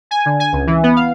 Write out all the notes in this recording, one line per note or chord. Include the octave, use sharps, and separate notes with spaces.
G#5
D3
G#5
C#2
E3
B3
F5